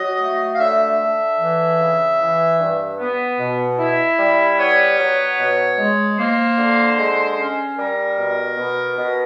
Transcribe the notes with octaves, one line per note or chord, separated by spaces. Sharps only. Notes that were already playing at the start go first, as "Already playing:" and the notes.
Already playing: F#3 D#5
A3
F5
D3 E5
D3
E3
C#3
E3
G2
B3
B2
E4
G3
B3 C#5
F#3
B2
G#3
A#3 C5
D3
G#3
C#4
G3 A#4
B2
B2
B2